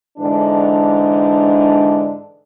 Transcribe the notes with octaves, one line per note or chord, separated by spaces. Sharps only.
G#2 D3 E3 D4